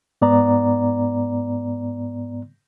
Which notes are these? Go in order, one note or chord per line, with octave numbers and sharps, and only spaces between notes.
G#2 B3 D5 A#5